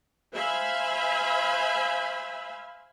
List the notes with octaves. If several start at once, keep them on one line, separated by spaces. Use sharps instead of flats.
C5 E5 F5 G#5 B5